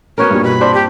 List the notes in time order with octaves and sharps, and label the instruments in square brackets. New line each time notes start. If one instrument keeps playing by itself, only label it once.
[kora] B3 F#4 A#4 [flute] C#4
[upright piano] G2 A#2 G3
[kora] B2 [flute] B5
[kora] C4 D4 C5
[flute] G4